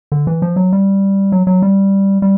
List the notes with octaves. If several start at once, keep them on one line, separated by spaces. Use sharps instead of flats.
D3
E3
F3
F#3
G3
F#3
F#3
G3
G3